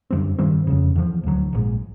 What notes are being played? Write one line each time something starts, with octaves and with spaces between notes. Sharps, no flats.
F#2 D3 G3 C4
G2 D#3 G3 C4
F1 F2 C#3
E2 C3 F3
D2 D3 F#3
A#1 G#2 E3 G#3